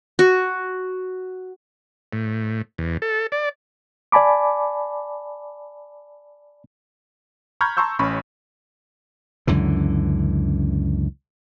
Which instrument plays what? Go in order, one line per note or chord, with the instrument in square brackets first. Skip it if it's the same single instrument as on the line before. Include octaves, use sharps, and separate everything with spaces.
[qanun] F#4
[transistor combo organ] A2
E2
A4
D5
[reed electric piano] D5 G#5 A5 B5 D6
[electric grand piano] A#5 B5 C#6 F6 G6 G#6
A5 A#5 C6 C#6 E6 G6
A1 C#4 B5 C#6
[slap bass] C#2 F#2 D3 E3